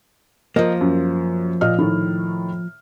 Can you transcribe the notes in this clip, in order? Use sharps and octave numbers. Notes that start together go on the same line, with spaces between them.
F3 A#3 A#4 D#5
F#2
A#2 D#5 F6
A2 D#3